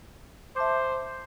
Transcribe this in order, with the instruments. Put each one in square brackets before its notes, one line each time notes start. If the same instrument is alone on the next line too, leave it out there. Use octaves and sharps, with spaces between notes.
[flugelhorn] C5 [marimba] E5 A5 D6